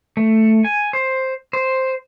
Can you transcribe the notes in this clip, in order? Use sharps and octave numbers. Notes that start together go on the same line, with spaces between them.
A3
G#5
C5
C5